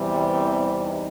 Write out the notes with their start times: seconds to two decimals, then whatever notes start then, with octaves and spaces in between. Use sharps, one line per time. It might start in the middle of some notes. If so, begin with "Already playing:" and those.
Already playing: E2 C3 E3 G3
0.31 C4
0.80 D#4